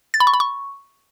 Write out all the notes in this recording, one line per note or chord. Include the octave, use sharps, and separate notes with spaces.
A6
B5
C#6
B5
C#6